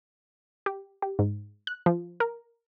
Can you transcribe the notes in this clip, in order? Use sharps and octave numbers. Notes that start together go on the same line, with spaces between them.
G4
G4
G#2
F#6
F3
A#4